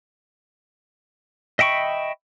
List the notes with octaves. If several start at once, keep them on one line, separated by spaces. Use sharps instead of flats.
D#5 E5 G5 B5 C#6